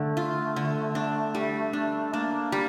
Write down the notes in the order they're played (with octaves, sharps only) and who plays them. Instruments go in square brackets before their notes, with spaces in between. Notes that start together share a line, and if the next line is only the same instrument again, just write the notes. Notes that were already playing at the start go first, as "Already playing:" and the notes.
Already playing: [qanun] D3 [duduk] A3
[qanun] F4
D3
D4
G3
D4
[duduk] A#3 [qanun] D4
[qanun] G3